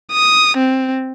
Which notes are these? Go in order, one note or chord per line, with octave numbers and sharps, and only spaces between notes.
D#6
C4